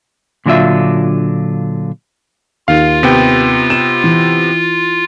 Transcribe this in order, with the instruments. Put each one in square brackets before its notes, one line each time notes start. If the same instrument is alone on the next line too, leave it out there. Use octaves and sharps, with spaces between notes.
[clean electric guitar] A#2 D3 F#3 D4 F4 E5
[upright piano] D#2 [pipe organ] F4 [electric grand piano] F5
[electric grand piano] C3 B3 G5
[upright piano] E7
E3